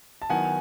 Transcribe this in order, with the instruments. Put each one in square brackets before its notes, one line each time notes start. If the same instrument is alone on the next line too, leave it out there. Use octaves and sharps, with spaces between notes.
[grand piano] A5
[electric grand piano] D#3 F#3 B3 E4 [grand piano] F#5 G#5